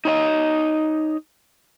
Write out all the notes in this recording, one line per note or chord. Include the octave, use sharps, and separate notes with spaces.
D#4 C#5 D#5